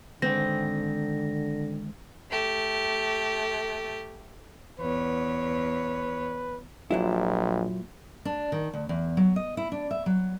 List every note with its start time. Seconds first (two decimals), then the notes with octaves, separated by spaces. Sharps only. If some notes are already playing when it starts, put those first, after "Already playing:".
0.22 D3 D#3 G#3 C4 G5 A#6
2.30 A3 G4
4.80 E2 B4 C#5
6.91 A#1 A#2 F#3 E4
8.25 D4
8.52 D#3
8.74 D2
8.89 E2
9.17 F#3
9.36 D#5
9.57 E4
9.72 D4
9.91 E5
10.06 F#3